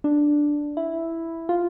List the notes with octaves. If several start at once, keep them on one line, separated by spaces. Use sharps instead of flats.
D4
E4
F4